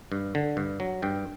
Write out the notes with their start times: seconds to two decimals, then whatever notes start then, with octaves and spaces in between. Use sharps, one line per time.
0.12 G2
0.35 D3
0.57 G2
0.80 F#3
1.02 G2 G5